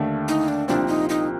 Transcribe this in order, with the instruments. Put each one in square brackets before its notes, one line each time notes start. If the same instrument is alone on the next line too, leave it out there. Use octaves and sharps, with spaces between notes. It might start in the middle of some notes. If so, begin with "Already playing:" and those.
Already playing: [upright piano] D#2 D3 A3
[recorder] D#4
D4
[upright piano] C2 A#2 F3 C4 [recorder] D4
[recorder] D#4
D#4